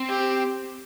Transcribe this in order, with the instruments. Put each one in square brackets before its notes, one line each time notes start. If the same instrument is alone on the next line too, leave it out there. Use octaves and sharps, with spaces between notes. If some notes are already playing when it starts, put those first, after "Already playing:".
Already playing: [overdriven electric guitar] C4
[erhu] G4